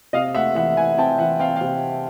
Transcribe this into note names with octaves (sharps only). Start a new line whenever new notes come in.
C3 D#5 F5
A3 E5 F#5
E3 E5 F#5
E3 F#5 G#5
C4 G5 A5
E3 E5 F#5
C4 F5 G5
F5 G5
C3